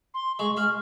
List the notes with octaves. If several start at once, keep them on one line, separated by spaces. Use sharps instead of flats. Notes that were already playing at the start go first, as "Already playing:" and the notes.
C6
G#3 C#6
G#3 F6